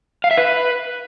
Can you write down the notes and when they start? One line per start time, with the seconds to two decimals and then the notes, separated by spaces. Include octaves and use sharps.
0.24 F5
0.31 E5
0.37 B4